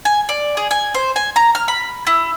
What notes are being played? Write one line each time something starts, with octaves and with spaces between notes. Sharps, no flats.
G#5
D5
G#4
G#5
C5
G#5
A#5
F6
B5
E4